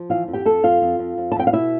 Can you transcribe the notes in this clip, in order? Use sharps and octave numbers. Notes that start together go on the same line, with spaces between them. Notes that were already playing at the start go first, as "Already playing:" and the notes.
Already playing: F3
E3 F4 F5
F2
G4 G5
F2 A4 A5
F2 F4 F5
F2
F2
F2
A5
F2 G5
F5
B2 E4 E5